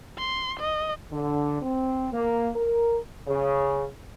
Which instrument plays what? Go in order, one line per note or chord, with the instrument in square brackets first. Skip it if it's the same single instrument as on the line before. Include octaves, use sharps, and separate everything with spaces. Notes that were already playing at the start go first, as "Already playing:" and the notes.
[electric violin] C6
D#5
[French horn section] D3
C4
A#3
A#4
[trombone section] C#3